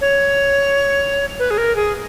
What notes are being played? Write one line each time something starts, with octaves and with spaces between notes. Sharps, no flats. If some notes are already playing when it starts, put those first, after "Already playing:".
C#5
B4
G#4
A#4
G#4